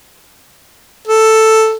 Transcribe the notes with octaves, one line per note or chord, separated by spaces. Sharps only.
A4